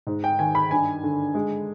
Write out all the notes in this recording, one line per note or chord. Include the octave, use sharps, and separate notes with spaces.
G#2
G5
D#3 G#5
B5
G2 G#5
D3
G#3